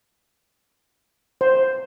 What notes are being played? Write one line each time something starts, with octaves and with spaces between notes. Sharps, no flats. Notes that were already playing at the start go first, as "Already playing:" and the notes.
C5